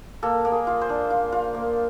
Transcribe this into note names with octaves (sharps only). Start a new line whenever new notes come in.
A#3 A4
A#3
G#4
F4
C5
D4
F4
F4
A#3